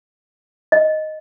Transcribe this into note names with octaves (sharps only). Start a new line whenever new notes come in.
D#5